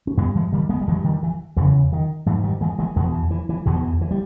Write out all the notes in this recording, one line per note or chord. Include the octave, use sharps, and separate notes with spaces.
C#4
G2 G#3 B3
E3 G#3
D#3 G3
G#3 B3
G3
G2 E3 G#3
D#3 G3
E3
E2 C#3 E3
D#3
G#2 E3
D#3 G3
E3 G#3
E3 G#3
E2 B2 E3 G#3
E3
E3
E3
E2 B2 E3
D#3
E3
E3
G3